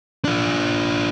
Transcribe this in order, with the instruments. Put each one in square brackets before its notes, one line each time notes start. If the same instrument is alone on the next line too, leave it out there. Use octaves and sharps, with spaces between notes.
[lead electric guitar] D4 F4